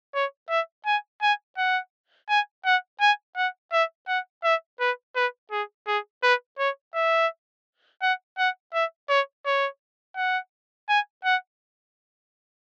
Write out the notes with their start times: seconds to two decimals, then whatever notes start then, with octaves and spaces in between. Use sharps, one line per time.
0.14 C#5
0.50 E5
0.86 G#5
1.22 G#5
1.58 F#5
2.29 G#5
2.65 F#5
3.01 G#5
3.37 F#5
3.72 E5
4.08 F#5
4.44 E5
4.80 B4
5.16 B4
5.51 G#4
5.87 G#4
6.23 B4
6.59 C#5
6.95 E5
8.02 F#5
8.38 F#5
8.74 E5
9.09 C#5
9.46 C#5
10.16 F#5
10.89 G#5
11.25 F#5